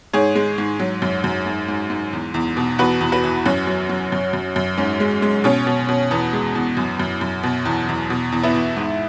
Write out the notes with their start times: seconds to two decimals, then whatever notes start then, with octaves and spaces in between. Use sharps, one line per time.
0.13 G#2 G#4 C#5
0.35 G#3
0.58 G#2
0.80 F#3
1.02 F#2
1.24 F#2
1.46 G#2
1.68 G#2
1.90 G#2
2.13 E2
2.34 E2
2.57 B2
2.79 E2 F#4 B4
3.01 E2
3.12 F#4 B4
3.24 E3
3.46 F#2 C#4 F#4
3.67 F#3
3.89 F#3
4.12 F#2
4.33 F#2
4.56 F#2
4.78 G#2 C#4
5.00 G#3
5.22 G#3
5.44 B2 C#4
5.67 B2
5.89 B2
6.11 E2 B3
6.33 G#3
6.55 E2
6.77 F#2
6.99 F#2
7.21 F#2
7.43 B2
7.65 E2
7.89 E2
8.10 B2
8.32 E2
8.43 B3 E4
8.55 E2
8.76 G#2